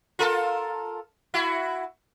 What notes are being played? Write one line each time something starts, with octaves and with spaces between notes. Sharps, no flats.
F4 A4 A#4
E4 F#4